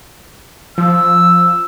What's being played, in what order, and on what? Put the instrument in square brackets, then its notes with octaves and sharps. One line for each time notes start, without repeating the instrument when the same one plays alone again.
[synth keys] F3 [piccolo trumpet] E6